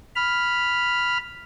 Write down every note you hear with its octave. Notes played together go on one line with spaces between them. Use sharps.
B5 F6